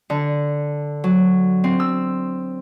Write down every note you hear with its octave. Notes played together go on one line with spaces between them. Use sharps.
D3
F#3
C4
E6